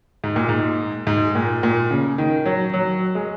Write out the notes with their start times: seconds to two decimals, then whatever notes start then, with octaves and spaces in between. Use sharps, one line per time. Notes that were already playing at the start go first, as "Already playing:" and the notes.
0.24 G#2
0.36 A#2
0.49 G#2
1.07 G#2
1.35 A#2
1.63 A#2
1.91 C#3
2.18 D#3
2.46 F#3
2.74 F#3
3.15 G#3